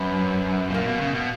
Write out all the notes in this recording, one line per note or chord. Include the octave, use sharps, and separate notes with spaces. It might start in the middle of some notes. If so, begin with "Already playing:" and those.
Already playing: F#2 B3
B2
A#2 A#3
B2
C#3
B2